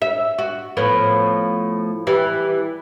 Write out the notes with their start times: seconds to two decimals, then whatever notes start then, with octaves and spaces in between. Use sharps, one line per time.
0.02 E5
0.39 F#4
0.77 A2 F3 B3
2.07 E3 G3